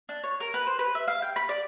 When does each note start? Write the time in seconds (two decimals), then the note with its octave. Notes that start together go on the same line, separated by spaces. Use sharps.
0.09 D4
0.23 C#5
0.40 A#4
0.54 B4
0.67 C5
0.79 B4
0.95 E5
1.08 F5
1.22 G5
1.36 B5
1.49 D5